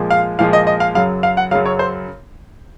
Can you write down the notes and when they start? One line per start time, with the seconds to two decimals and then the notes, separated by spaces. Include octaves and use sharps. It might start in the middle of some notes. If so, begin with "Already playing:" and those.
Already playing: A#2 F3 G#3
0.10 F5
0.39 A#2 F3 G#3 F5
0.53 D#5
0.67 D#5
0.80 F5
0.95 F#2 C#3 F#3 F5
1.23 F5
1.37 F#5
1.51 F#2 C#3 F#3 F5
1.66 C#5
1.79 C5